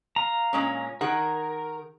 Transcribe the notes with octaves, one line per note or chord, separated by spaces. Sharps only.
F5 A#5
A#2 G#3 C#4
D#3 G#4 A#4 F#5